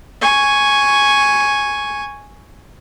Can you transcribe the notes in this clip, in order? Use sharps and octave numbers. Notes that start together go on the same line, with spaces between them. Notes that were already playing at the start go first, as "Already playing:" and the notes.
G#5 C#6